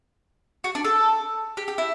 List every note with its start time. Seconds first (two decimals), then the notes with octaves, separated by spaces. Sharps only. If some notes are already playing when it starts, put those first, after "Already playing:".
0.64 F#4
0.75 D4
0.85 A4
1.57 G4
1.68 G4
1.78 E4